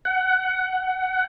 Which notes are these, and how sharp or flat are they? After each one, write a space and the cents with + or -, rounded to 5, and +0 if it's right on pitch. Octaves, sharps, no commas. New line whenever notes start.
F#5 +20